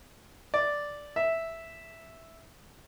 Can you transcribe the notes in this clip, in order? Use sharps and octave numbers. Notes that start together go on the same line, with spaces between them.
D5
E5